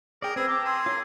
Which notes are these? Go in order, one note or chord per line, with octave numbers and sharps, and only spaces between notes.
G#4 A#4 D5 G5 D#6
C4 G#4 B4 E6
G5 A5 A#5 D6
G#4 C6
F4 A#4 C#5